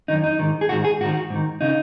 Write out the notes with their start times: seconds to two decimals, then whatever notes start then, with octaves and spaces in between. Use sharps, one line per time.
0.08 F#2 D#3 D#4
0.24 D#4
0.39 G#2 D#3
0.61 G#4
0.69 G#2 D#3 F#4
0.84 G#4
1.01 G#2 D#3 F#4
1.30 G#2 D#3
1.61 C#3 D#4